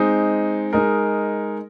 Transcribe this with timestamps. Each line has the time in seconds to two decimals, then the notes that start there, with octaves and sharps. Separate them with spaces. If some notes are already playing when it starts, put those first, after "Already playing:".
Already playing: G#3 C4 D#4
0.73 G#3 D#4 A#4